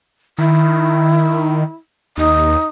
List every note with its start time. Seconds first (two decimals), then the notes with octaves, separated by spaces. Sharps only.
0.38 D#3 E4
2.18 D#2 D#4